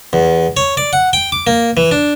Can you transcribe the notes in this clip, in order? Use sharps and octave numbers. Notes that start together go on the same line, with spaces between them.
E2
C#5
D5
F#5
G5
D6
A#3
E3
D4